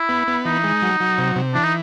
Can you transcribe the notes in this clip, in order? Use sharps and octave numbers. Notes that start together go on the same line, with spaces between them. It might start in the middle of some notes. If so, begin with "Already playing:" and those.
Already playing: E4
B3
B3
E3 D#4
G#3
F#3
F#3
C3
C3
E3 D4
D#4